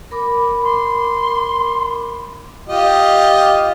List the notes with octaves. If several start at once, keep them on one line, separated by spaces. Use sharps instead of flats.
A#4 B5 D6
C6
F4 G4 D#5